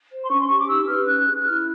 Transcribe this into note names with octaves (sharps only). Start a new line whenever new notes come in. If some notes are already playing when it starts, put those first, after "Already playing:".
C5
C6
C#4 C#6
C6
G4 C#6
D6
D#4 E6
B4 F6
C#4 F#6
G#4
F#6
E4 F6